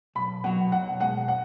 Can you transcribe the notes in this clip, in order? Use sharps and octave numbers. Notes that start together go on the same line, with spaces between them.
B1 B5
B2 F#3 F#5
B1 F#5
B2 G#3 F#5
F#5